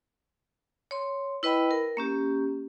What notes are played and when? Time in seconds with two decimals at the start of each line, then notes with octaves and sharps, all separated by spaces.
0.91 C#5 C6
1.43 E4 B4 D#5 G5 B5
1.71 A#4
1.97 A#3 C#4 G4